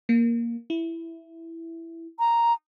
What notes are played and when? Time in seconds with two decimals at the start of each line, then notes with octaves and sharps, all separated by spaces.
0.09 A#3
0.70 E4
2.19 A#5